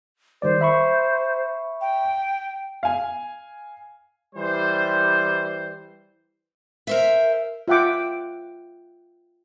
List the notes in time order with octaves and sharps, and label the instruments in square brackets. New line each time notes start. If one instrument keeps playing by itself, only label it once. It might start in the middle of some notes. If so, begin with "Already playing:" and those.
[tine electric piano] D#3 G3 D5 [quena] C5
[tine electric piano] E5 B5 C#6
[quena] G5
[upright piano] F5 G#5
[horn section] E3 G3 C5
[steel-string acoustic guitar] A#4 C5 E5
[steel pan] F4 E5 F#5 G5 D6